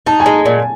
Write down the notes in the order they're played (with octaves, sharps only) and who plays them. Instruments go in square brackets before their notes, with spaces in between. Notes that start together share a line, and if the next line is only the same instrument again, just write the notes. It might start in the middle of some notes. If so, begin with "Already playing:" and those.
[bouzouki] D#4 [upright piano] A5
[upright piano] G#5
[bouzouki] G#3
A#2